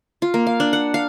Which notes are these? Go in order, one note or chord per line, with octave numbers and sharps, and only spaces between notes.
F4
A#3
F5
D4
F#5
F5